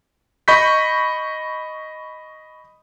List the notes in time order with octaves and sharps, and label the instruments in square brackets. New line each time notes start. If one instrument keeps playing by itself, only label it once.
[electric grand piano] D#5 B5 C#6 G6 B6